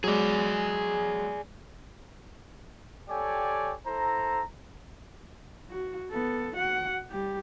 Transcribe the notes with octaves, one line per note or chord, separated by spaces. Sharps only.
F#3 G#3 G#4 D5
G4 A4 C#5 D5 G5 G#5
E4 A4 C5 A#5
F#4
B3 A4
F#4 F#5
G3 G4